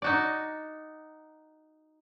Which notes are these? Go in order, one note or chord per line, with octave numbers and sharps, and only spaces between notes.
D#4 F#4 D5